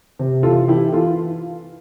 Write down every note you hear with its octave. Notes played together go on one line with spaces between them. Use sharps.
C3
E3 F4 A4
E3 E4 G4
E3 F4 A4